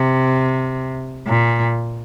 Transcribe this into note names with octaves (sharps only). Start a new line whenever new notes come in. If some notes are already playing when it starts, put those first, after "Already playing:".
Already playing: C3
A#2